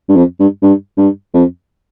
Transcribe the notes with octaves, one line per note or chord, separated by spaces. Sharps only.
G2
F2
G2
G2
G2
F2